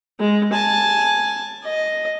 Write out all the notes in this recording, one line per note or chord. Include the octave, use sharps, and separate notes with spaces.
G#3
G#5 A5
D#5